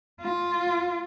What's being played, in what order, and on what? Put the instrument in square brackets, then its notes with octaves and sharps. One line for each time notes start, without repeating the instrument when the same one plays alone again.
[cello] F4